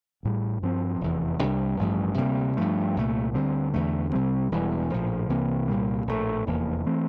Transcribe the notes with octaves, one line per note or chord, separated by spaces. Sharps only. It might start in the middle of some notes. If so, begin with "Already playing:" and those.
A1 A2 G3
G2 F3 C4
F1 E2 E3
C2 C3 G3 D4
A1 G2 F3 A3
D2 C3 G3 A#3
G2 F3 A3
C2 A#2 A3
D2 D3 G3 C4
E2 D3 A3
C2 C3 G3 C4
E1 E2 E3 G3
A#1 A2 F3
C2 C3 E3 A#3
C2 A#2 G3 A#3
A#1 A2 E3 A3
F1 E2 E3 A#3
E3 A3 C4